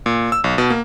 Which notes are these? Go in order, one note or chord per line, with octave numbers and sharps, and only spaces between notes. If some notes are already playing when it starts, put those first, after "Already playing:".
A#2
E6
B1
B2
A#3